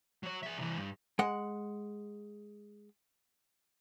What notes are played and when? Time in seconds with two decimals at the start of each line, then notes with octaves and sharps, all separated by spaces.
0.23 F#3 C#5
0.43 G#4 E5
0.57 C2 E3
0.77 G2
1.19 G#3 F#5